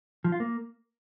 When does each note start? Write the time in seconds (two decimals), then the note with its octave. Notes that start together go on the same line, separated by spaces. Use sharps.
0.24 F3
0.32 F4
0.40 A#3